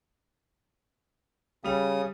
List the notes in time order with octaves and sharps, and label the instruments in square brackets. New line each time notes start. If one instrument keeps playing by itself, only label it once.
[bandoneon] C#3 D#6 [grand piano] G3 F7